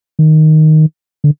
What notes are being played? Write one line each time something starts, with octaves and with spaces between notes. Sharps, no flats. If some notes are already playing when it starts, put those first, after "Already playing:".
D#3
D3